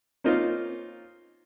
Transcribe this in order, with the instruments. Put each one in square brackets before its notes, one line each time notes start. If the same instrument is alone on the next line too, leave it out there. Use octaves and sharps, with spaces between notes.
[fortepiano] A#3 C4 C#4 D#4 F4